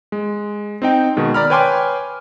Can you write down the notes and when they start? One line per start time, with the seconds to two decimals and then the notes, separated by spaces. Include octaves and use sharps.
0.12 G#3
0.82 C4 D#4 G5
1.17 B2 D#3 G#3
1.34 D5 A#5 B5 F6
1.50 B4 C#5 G5 G#5 C6 D6